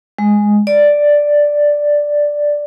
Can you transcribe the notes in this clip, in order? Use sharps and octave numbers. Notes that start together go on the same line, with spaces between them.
G#3
D5